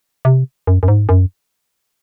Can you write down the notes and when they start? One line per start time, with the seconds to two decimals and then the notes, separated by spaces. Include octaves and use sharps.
0.25 C3
0.67 F#2
0.83 F#2
0.88 G#2
1.09 F#2